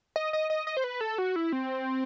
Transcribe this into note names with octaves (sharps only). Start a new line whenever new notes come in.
D#5
D#5
D#5
D#5
C5
B4
A4
F#4
E4
C4